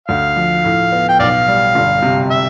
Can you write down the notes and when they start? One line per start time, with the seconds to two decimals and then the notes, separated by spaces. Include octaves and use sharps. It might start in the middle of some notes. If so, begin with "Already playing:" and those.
0.08 D2 F5
0.36 F3
0.64 A2
0.92 B3
1.09 G5
1.19 B1 D5 F5
1.48 G3
1.75 G1
2.02 C3
2.31 E5